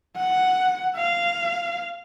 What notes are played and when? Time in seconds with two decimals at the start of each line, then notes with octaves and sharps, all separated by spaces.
0.16 F#5
0.95 F5